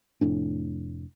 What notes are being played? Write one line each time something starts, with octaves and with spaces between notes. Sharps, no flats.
F1 F2 A2 D4